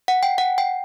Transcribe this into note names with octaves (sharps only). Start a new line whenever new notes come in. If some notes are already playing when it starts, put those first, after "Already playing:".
F#5
G5
F#5
G5